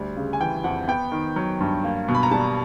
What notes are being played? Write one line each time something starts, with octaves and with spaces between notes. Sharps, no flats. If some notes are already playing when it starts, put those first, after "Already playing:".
Already playing: D2 G3
C#3
G#5
E3 G5
F2 F#5
B3 G5
D#3
F#3
G2
A#3
B2
B5
A#5
G3 A5